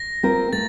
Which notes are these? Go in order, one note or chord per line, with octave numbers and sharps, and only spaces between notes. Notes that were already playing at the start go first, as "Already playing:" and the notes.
Already playing: A#6
C4 F4 A#4
A3 A6